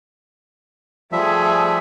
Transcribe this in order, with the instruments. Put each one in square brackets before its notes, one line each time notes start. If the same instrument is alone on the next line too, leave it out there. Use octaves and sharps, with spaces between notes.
[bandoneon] F3 G3 E5 [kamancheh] A3 G#4